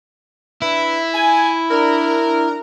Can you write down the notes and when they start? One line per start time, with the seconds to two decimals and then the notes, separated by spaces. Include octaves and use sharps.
0.62 D4 E4 B4 E5
1.14 G#5
1.70 D4 A#4